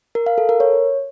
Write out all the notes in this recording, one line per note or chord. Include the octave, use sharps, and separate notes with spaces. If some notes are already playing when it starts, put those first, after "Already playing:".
A#4
F5
A4
A#4
C#5